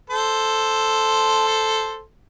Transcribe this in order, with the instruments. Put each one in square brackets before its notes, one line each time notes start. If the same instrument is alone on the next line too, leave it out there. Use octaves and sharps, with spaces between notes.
[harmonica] A4 C5